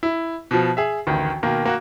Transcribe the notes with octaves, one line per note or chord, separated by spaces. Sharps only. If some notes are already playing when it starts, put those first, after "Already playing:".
E4
B2 F3
G#4 E5
A1 D2 D#3
B2 D#3 A#3
A#3 F#4